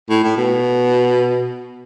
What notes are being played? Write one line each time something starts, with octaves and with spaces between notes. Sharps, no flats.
A2
A2
B2